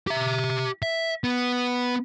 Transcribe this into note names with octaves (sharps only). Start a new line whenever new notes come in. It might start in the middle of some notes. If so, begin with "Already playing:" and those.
G4 E5
E5
B3